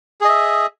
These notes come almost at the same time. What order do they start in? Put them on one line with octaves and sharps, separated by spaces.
G#4 D#5 E5